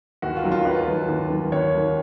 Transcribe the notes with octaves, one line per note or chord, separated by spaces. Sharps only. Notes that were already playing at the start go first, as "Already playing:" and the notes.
D#2 F#4
F4
D#3 F#3
F4
D#2 B4
D#3 F#3
D#2
D#3 F#3
D#2 C#5
D#3 F#3